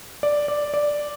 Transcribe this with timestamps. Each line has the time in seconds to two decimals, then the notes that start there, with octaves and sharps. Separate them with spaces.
0.23 D5
0.48 D5
0.74 D5